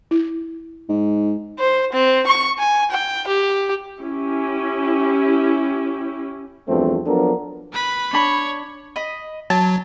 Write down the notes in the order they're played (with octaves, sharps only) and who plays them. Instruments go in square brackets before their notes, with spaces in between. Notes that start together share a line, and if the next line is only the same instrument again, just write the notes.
[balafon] E4
[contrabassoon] G#2
[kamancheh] C5
C4
C#6
G#5
G5
G4
[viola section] C#4 E4 G4
[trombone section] E2 G2 F3 A3 C4
F3 F#3 B3 D4 A4 A#4
[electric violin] B4 B5
[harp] D4 B5 [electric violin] C#5
[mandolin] D#5 B5
[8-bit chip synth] F#3 [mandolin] A5